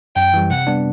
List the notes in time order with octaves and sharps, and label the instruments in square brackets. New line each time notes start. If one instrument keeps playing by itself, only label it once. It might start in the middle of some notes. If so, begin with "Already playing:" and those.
[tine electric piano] F#2 [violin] G5
[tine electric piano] E3 G3
[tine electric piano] C3 [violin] F#5
[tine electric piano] G3 B3 D4